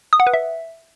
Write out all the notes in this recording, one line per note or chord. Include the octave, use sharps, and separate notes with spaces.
D#6
F#5
B4
E5